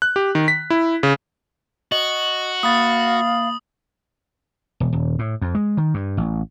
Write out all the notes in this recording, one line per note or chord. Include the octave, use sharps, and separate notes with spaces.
F#6
G4
D#3
B6
E4
C#3
F#4 D#5 F#7
A#3 F5 B5 D#6 A6
E1
D#1
A2
F2
G#3
D#3
G2
A1